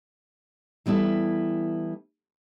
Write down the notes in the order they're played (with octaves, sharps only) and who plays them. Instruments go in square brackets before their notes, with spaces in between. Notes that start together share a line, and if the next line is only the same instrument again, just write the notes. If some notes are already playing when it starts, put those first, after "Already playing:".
[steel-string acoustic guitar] E3 G3 B3 E4 A4